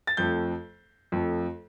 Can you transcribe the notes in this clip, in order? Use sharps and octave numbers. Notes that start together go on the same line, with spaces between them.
A6
F2 F3 A3 G6
F2 F3 A3